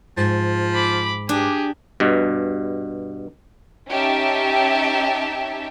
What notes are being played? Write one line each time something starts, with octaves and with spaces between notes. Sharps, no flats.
G#2 F3
B5 D6
D4 G4 G#4
G2 B2
C#4 D#4 G4 E5 G5 A5